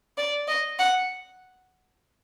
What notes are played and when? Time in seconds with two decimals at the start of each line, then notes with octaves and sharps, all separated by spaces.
0.18 D5
0.48 D#5
0.79 F#5